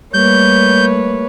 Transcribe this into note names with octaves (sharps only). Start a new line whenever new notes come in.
G3 A3 A#3 B4 C#5 G6